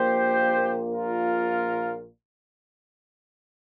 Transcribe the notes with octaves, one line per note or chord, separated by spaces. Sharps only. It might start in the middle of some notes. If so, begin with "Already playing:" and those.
Already playing: A#1 A#2 A#3 G4 C5
F4 A#4